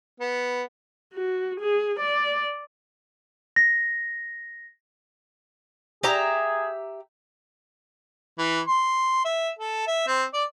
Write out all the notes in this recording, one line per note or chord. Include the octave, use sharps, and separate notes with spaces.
B3
F#4
G#4
D5
A#6
G4 G#4 E5 A#5
E3
C6
E5
A4
E5
C4
D5